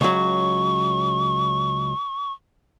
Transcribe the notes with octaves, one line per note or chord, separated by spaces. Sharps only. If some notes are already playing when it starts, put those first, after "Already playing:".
C#2 F#3 C#6